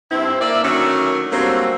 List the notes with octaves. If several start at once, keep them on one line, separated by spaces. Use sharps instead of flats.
G2 C4 E4
A#3 D5 E5
D3 D#3 F#3 A3 C#4
D3 F#3 G3 A3 A#3 C4